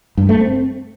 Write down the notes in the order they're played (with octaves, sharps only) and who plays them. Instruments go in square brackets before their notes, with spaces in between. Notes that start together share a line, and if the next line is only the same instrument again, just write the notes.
[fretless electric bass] G2
A3
C4